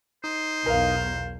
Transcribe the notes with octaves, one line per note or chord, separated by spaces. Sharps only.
D#4 C5
B1 E2 B2 A#4 F5